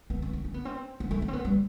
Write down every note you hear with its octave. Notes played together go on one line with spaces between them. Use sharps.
B3
C4
B3
C4
B3
C4
B3
A3
B3
C4
B3
G3